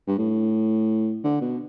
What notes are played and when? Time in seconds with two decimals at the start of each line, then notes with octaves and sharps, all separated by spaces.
0.07 G2
0.18 A2
1.24 D3
1.42 B2